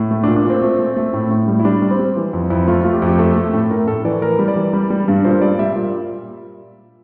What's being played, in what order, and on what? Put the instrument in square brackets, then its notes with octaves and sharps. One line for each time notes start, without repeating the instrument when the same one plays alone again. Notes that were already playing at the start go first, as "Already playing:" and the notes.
Already playing: [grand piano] A2
A3
D4
A#2
D4
A#2 C4
A3
A3
A3
A2
A2
G3
E4
G3 D4
G3
C4
G3
E3
F2
F2 E4
A3 F4
A3 F4
G4
F2
G4
A3 A4
A3
A2
A2 A#4
A2 A4
E3 D5
E3 A#4
G3
D5
E3
G3
G3
G2
A#2 C5
G3 D5
G3 E5
A#2